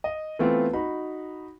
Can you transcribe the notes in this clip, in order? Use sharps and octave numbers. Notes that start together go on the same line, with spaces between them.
D#5
E3 A3 B3 C4 F4
D#4 F#4 B5